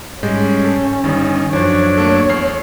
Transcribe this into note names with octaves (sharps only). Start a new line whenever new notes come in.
G#2 G3 G#3 C#4
A4
G1 D#3 G3
F#2 F3 D4 C5 C#5
A3 A#3 A4
E2 F6 C7